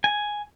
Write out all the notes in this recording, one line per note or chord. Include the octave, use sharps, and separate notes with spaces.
G#5